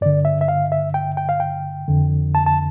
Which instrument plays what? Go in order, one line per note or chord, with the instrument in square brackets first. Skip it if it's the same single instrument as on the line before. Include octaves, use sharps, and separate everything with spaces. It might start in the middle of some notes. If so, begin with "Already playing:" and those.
[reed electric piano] G2 D3 D5
E5
E5
F5
E5
G5
G5
F5
G5
F2 D3
A5
A5